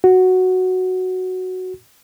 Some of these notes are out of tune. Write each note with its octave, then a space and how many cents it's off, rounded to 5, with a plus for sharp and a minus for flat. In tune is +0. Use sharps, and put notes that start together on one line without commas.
F#4 +0